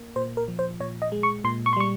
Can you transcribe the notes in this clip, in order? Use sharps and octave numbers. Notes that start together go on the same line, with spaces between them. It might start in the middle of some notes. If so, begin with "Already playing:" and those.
Already playing: A#3
A#2 C5
A#4
F3
C5
A#2 C#5
D#5
G#3
C#6
A#2 C6
C#6
C6
G3 C#6